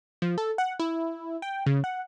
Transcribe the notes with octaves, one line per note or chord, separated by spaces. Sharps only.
F3
A4
F#5
E4
G5
C#3
F#5